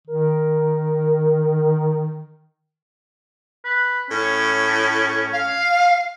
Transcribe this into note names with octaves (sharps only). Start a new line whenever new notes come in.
D#3 A#4
B4
A2 C#4
F5